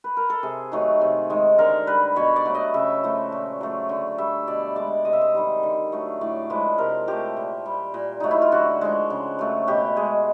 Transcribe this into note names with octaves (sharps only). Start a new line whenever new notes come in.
B4
A#4
A4
C3 G#4
D#3 F#3 A3
C3
D#3 G#3
D3 A#4
G3 B4
B2 C#5
D5
F#3 A3
D#5
C#3 E5
F3 A3
A#2
F#3 A3
D3
G3 E5
B2 D5
G#3 D5
C3 D#5
E5
D#5
D#3 G3
D3
F#3 A3
A2 D5
F3 G#3 B4
C3 A#4
F3 A3 G4
A#2
G3
A#2
F#3 A3 D#4
E4
F4
D3 F#4
F3 G#3
C#3
F#3 A3
B2 G4
G#3 G#4